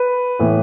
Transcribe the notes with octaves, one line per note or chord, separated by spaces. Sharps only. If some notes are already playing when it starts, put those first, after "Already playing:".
Already playing: B4
A2 E3 B3